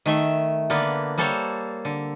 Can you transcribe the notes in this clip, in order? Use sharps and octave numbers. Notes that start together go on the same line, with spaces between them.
D#3 A3 E5
D3 A#3 B3 D4 B4
G3 A#3 A4 C5 C#5
D3